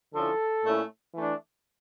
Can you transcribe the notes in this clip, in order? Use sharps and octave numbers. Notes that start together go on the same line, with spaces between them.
D3 F3 C#4 E4 A4
A#2 A3 C#4 E4
E3 A3 D4